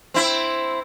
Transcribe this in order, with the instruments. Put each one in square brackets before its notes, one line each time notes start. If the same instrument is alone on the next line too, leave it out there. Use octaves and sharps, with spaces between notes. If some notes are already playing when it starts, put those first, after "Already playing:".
[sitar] C4 E4